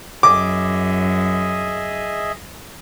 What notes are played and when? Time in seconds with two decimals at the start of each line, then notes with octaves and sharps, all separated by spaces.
0.23 F#2 G#4 D#5 E5 D6